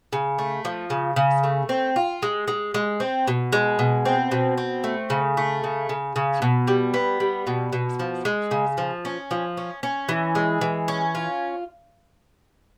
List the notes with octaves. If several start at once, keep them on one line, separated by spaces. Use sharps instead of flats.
C#3
A3
F3
C#3
C#3
A3
C4
F4
G#3
G#3
G#3
C4
B2
G#3
B2
C4
B2
C4
A3
C#3
A3
C#3
C#3
C#3
B2
G3
B3
G3
B2
B2
F3
G#3
C#3
F3
C#4
F3
C#4
C#4
E3
G#3
E3
C#4
F4